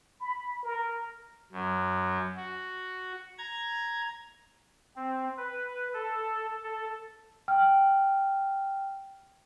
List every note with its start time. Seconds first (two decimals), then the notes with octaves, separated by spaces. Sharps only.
0.21 B5
0.64 A#4
1.52 F#2
2.37 F#4
3.38 A#5 G#6
4.96 C4
5.38 B4
5.94 A4
6.64 A4
7.48 G5 F6